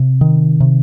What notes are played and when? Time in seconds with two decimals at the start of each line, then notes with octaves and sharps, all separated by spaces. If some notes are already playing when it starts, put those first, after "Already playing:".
Already playing: C3
0.21 D#3
0.60 C3